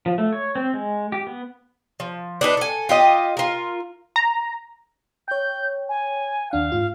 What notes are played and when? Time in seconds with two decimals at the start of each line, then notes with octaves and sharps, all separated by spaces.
0.06 F3
0.18 A3
0.33 C#5
0.55 C4
0.74 G#3
1.12 G4
1.27 B3
2.00 F3
2.41 D4 D#4 G#4 B4
2.57 A4 G#5
2.89 F4 G4 D#5
3.37 F4 A#4
4.16 A#5
5.28 C#5 G5 G6
5.89 G#5
6.51 D#2 D4 F5 F#5
6.72 G#2 F4